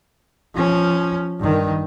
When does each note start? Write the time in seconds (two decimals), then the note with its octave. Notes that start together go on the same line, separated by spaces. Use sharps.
0.54 F3 C#4
1.40 G2 D#3